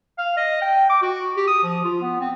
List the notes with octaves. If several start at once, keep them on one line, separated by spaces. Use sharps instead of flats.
F5
D#5
G5
D6
F#4
G4
D#6
F3
F4
B3
C4